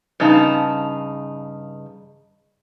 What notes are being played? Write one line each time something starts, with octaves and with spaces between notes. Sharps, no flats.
G2 C#3 D#4 A5